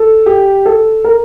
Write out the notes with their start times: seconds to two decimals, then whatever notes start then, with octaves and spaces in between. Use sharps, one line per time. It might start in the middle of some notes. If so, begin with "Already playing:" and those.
Already playing: A4
0.26 G4
0.66 A4
1.04 A#4